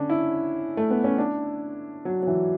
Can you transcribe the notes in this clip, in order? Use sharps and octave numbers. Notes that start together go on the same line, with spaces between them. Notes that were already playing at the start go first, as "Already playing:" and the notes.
Already playing: D3 C#4 D4
E4
A3
B3
C#4
D4
F#3
F#3
E3